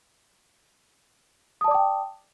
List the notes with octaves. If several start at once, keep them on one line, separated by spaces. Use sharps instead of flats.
D5 G5 A5 D6 D#6